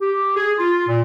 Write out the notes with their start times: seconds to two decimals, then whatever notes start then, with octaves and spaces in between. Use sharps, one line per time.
0.01 G4
0.36 G#4
0.59 F4
0.88 A#2